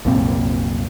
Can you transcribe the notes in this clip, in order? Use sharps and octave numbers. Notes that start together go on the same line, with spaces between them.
C2 F#2 A#2 C4